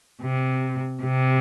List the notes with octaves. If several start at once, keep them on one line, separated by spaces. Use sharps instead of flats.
C3
C3